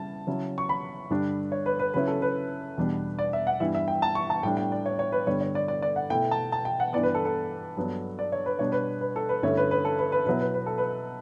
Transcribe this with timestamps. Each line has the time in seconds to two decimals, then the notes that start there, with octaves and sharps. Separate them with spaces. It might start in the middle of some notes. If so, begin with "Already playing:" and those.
Already playing: C#3 G3 E4 A5
0.27 C#3 F#3 C#4 E4
0.58 C#6
0.69 B5
1.10 G2 D3 G3 D4
1.52 C#5
1.66 B4
1.79 B4
1.94 C#3 F#3 C#4 E4 B4
2.08 A4
2.22 B4
2.78 E2 B2 G3 D4
3.19 D5
3.33 E5
3.47 F#5
3.60 G2 E3 G3 B3 E4 E5
3.75 E5
3.88 G5
4.02 A5
4.15 C#6
4.30 A5
4.43 A2 G3 D4 G5
4.57 G5
4.72 D5
4.86 C#5
4.99 C#5
5.12 B4
5.27 G2 D3 G3 B3 C#5
5.41 C#5
5.55 D5
5.68 D5
5.82 D5
5.96 F#5
6.10 B2 A3 E4 G5
6.31 A5
6.52 A5
6.65 G5
6.80 F#5
6.93 G2 E3 B3 D5
7.03 B4
7.15 A4
7.25 A4
7.77 G2 F#3 B3 D4
8.19 D5
8.32 C#5
8.46 B4
8.59 B2 G3 D4 C#5
8.72 B4
9.01 B4
9.16 A4
9.29 B4
9.43 G2 D3 A3 C#4 E4 C#5
9.57 B4
9.71 B4
9.85 A4
9.99 B4
10.12 B4
10.26 B2 F#3 B3 E4 B4
10.41 B4
10.54 B4
10.66 A4
10.78 B4